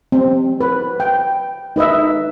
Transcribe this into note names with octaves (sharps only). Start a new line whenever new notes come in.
C4
B4
G5
D#4 B4 D#5 E5